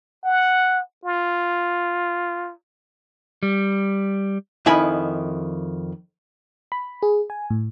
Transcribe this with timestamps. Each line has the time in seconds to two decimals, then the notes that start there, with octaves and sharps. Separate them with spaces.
0.24 F#5
1.05 F4
3.43 G3
4.66 F2 D#3 E4 G#5 B5
6.72 B5
7.03 G#4
7.30 G#5
7.50 A2